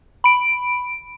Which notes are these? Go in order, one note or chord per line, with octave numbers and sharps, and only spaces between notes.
B5 D7